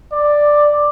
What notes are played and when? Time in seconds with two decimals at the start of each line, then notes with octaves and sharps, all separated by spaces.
0.13 D5